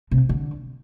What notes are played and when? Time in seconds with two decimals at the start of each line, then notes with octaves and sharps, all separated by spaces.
0.11 C3
0.29 D3